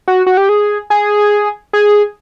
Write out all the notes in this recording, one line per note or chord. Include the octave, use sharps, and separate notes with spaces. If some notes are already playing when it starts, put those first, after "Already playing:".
F#4
F#4
G4
G#4
G#4
G#4